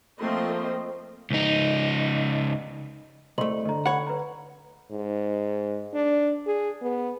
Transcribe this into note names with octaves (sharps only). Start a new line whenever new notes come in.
F3 A3 A#3 C4 D#5 C6
C#2 D#4
C2 A3 C5 D#5 C6 F#7
D3 D#5 A#5
C#5 F#5 B5
B4 A#5
G#2
D4
G#4
B3